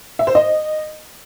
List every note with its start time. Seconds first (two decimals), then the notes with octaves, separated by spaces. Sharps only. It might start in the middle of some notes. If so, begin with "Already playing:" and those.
0.19 E5
0.27 C5
0.35 D#5